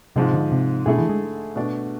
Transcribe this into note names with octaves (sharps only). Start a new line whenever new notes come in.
G#2 C3 F3 G#3
D3
C3
B2 D3 A3 E4 G#4
E3
G#3
B2 A3 D4